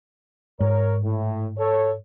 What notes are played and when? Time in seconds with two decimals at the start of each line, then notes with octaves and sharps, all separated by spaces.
0.60 G#2 A#4 C#5
1.04 A2
1.58 A4 C#5